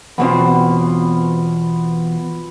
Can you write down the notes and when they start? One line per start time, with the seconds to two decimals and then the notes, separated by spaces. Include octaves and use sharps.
0.18 E2 B2 B3 C4 F4